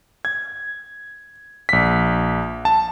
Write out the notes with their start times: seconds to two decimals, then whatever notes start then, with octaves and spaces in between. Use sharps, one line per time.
0.25 G#6
1.69 A#1 B6
2.65 A5